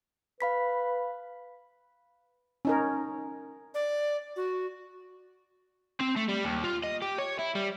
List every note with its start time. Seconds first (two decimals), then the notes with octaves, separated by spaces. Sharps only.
0.41 B4 F5 B5 B6
2.65 C#4 D#4 A#4
3.74 D5
4.36 F#4
6.00 C4
6.16 A3
6.28 G3
6.44 D#2
6.64 F4
6.84 D#5
7.02 G4
7.19 C#5
7.39 E4
7.55 G3